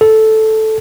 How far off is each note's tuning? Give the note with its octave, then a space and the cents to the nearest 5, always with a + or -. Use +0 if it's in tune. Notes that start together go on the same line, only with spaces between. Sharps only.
A4 -5